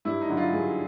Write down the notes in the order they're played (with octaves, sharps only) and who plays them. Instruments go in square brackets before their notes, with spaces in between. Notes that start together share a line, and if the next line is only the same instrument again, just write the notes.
[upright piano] G2 E4
D#4
D3 F#3
F4
G2 G#4